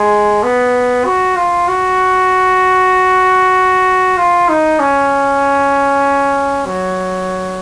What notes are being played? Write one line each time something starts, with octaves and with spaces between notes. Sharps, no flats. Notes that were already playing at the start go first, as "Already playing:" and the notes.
Already playing: G#3
B3
F#4
F4
F#4
F4
D#4
C#4
F#3